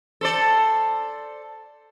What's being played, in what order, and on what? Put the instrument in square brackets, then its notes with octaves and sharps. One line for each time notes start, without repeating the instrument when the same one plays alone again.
[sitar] A4 C5 D5